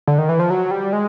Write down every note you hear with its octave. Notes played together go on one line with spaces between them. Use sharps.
D3
D#3
E3
F3
F#3
G3
G#3